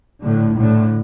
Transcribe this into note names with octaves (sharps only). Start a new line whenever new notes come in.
A2 D3
A2 D3